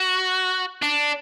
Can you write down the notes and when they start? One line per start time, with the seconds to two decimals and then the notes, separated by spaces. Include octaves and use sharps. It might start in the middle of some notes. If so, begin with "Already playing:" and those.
Already playing: F#4
0.82 D4